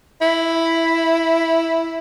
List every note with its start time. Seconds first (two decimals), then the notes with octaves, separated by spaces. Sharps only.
0.21 E4